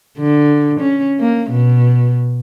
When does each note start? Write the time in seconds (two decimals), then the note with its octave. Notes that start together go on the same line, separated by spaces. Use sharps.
0.19 D3
0.80 C#4
1.20 A#3
1.50 B2